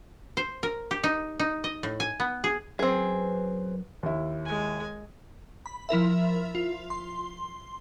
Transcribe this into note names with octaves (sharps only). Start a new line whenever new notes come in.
C5
A#4
G4
D#4
D#4
D#5
A2
G#5
B3
G#4
F#2 C4 G#4 B4
D#2 E4
G#3 G#5
B5
F3 E4 A#4 E5
F4
C6